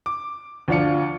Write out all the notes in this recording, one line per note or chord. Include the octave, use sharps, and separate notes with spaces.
D6
D2 F3 D4 F4 C#7